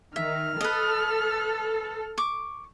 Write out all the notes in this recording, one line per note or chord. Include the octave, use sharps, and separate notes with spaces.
D#3 E5 F6
A4 B4 D#5
C#6 D6